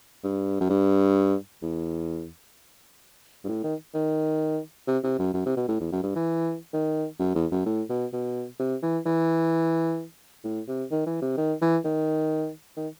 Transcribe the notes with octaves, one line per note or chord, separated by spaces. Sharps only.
G2
F#2
G2
E2
G2
A2
D#3
D#3
C3
C3
F#2
F#2
C3
B2
A2
E2
F#2
G2
E3
D#3
F#2
E2
F#2
A2
B2
B2
C3
E3
E3
A2
C3
D#3
E3
C3
D#3
E3
D#3
D#3